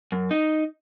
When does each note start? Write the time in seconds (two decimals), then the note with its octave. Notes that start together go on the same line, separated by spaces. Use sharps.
0.12 F#2
0.31 D#4